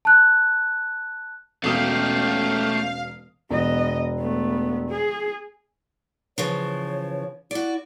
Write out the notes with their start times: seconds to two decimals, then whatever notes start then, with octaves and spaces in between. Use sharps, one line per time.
0.05 A5 F#6
1.64 E1 B2 A3 C#4 G4 F5 D#6
3.50 E1 B3 D#5
4.18 A3 B3
4.90 G#4
6.38 C#3 E3 F3 C#5
7.51 E4 F#4 D5